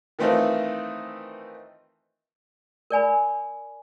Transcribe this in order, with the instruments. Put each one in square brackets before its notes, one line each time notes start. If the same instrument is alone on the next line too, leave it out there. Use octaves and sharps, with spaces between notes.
[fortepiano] D#3 E3 A3 C4 D#4 F4
[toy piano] A#4 D5 G#5 B5